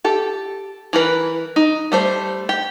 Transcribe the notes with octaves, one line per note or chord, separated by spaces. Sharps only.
G4 A4
E3 A#4 B4
D#4
G3 A3 C5
G4